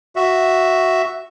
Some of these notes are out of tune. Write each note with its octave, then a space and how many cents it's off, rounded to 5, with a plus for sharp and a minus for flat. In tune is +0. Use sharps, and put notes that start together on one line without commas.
F#4 +0 E5 +0